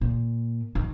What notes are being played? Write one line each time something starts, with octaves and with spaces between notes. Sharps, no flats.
A#2
D#3